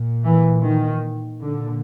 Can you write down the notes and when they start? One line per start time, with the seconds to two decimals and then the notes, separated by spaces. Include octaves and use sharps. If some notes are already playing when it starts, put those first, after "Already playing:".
Already playing: A#2
0.23 E3
0.63 D#3
1.43 A#2 D3